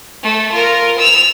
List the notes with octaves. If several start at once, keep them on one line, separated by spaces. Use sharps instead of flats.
A3
F4 A#4
E6 F7